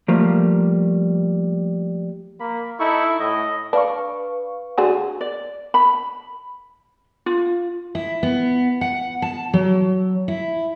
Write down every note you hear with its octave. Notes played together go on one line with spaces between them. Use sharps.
F3 G3 A3 A#3
A#3 B5
D#4 E4 A4 C#6
A2 D#5
D4 B4 F5 C#6
D3 F#4 G#4
D5
B5
F4
E4
B3
F#5
A5
F#3
E4